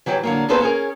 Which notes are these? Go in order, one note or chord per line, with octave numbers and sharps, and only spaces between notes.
E3 F#3 G4 C#5
D3 F#3 A#3
A#3 B3 G#4 A4 B4 C5
C#4 G#4 A#4